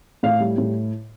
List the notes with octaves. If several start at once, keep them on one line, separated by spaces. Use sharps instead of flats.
A2 F5
G3
A2